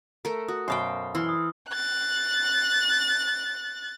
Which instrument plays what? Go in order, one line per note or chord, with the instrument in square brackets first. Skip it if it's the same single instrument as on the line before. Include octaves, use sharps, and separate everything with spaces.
[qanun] A3 A#4
[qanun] F#4 [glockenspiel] D#6
[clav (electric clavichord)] F#2 B2 [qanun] C5 F5 G5
[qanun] E3 C6 [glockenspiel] E6 F6
[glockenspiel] D#6
[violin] F#6 A6